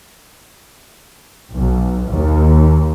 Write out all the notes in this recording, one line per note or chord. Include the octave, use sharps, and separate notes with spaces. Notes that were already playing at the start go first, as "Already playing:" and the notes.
B1
D#2